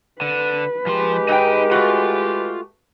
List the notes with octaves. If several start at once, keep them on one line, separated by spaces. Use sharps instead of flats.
D3 B4
F3 G#3 G4 C6
G#2 D#4 G5
A3 F4 F#4